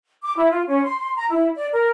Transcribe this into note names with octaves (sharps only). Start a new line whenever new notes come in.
D6
E4
F4
C#4
C6
C6
A#5
E4
D5
A#4